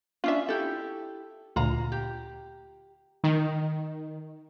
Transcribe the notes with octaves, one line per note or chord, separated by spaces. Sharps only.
C#4 D4 F4 E5
E4 G4 A4
D2 A#2 F4 F5 A#5
G4
D#3